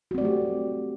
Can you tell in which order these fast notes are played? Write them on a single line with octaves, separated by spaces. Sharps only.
F#4 C4 D5 A3 G4